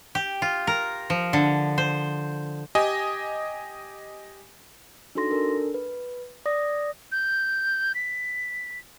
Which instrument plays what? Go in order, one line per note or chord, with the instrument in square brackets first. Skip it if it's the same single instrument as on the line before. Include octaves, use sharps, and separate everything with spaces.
[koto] G4
F4
A#4
F3
D3
C5
[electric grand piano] G4 D#5 G#5
[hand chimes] D4 D#4 F#4 A4 C6 A#6
D4 A4 A#4
B4
D5 D#6 A#6
[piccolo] G6
B6